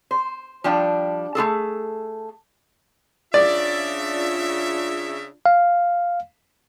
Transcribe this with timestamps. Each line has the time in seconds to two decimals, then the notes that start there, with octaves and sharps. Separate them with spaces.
0.11 C5
0.64 F3 G3 D4 G5
1.35 A3 F4 G#4 A4
3.34 C#3 D4 F4 D5 E5
5.46 F5